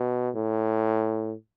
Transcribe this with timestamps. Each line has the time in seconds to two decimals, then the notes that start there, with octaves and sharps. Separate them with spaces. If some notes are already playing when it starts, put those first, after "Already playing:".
Already playing: B2
0.35 A2